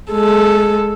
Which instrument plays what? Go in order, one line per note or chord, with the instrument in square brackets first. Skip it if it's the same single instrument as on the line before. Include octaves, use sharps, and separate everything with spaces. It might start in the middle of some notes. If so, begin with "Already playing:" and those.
[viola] G#3 A4